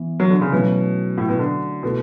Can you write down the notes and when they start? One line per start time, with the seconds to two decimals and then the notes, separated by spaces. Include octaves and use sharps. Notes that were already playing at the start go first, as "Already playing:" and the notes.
Already playing: E3 B3
0.20 F#3
0.30 D3
0.41 C#3
0.52 B2 F#3 A3 C#4 E4
1.18 A2
1.29 B2
1.39 D3
1.83 B2 A3 E4 A4